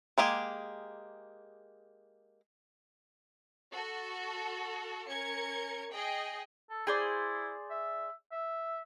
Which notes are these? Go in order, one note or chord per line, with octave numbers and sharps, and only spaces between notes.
G#3 A#3 G4 G#4
F#4 A4
C#4 A#4 G#6 C#7
G#4 D#5 G5
A4
E4 G#4 C5 D5
E5
E5